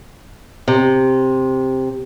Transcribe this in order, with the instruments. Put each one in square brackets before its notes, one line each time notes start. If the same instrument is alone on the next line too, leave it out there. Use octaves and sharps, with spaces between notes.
[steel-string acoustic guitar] C3